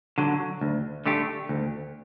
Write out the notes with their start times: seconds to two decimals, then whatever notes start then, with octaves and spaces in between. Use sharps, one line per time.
0.18 D3 F#3
0.61 D2
1.06 D3 A3 D4 G4
1.49 D2